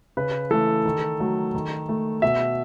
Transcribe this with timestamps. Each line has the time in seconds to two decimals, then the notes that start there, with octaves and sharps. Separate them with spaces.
0.17 C#3 B4
0.50 E3 A3 A4
0.85 D#3
1.20 F#3 A3
1.55 D#3
1.89 A3
2.22 B2 E5